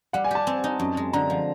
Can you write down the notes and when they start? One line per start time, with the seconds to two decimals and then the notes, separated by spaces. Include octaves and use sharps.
0.13 G3 F#5
0.24 G#5
0.31 G4 A5
0.47 C4
0.64 D#4
0.80 F#2
0.97 G#3
1.13 D3 A#5
1.30 F3